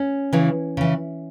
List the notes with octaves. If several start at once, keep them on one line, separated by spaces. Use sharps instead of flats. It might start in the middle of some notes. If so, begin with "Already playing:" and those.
Already playing: C#4
C#3 E3
C#3 E3